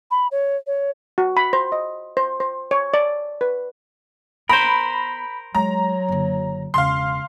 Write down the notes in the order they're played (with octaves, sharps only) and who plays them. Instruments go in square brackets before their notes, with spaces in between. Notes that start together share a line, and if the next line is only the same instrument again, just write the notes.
[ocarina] B5
C#5
C#5
[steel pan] F#4
B5
C5
D#5
C5
C5
C#5
D5
B4
[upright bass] B3 [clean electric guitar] A#4 C5 [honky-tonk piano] B5
[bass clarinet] F#3 [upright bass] G#3 [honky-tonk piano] A#5
[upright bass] F#1 D3
[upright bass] E1 C#3 [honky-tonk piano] F5 C6